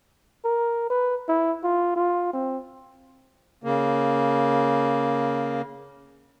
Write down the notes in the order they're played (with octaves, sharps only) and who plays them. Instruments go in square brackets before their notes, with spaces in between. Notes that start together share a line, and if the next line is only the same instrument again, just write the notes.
[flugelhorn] A#4
B4
E4
F4
F4
C4
[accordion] C#3 A#3